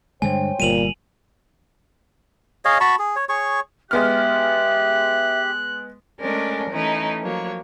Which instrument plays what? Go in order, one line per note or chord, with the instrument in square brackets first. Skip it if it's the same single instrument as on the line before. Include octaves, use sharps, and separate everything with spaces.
[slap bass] G2 D3 G#3 [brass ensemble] C5 C#5 G5 [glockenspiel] G#5
[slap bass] G1 G3 [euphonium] A#2 [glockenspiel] D#7 F7 F#7
[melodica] G#4 C#5 D#5 F5
F#4 A5 B5 C#6
G#4
C#5
G#4 C#5 C#6
[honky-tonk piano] G#3 B3 F6 [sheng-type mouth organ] G4 [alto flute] E5 [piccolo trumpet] F#6
[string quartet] G#3 A3 C#4 D4 A#4
E3 A3 C#4 D#4 E4
F3 F#3 A#3 C#5